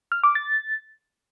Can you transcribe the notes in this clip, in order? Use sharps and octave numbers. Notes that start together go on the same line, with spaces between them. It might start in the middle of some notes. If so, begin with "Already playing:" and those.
F6
D6
A6